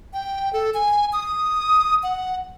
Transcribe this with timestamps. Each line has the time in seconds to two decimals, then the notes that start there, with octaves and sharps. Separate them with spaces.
0.13 G5
0.53 A4
0.74 G#5
1.13 D#6
2.03 F#5